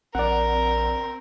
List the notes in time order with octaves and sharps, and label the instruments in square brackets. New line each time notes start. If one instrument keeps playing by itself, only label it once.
[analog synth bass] A#1 [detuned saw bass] C4 [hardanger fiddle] A#4 [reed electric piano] D5 F#5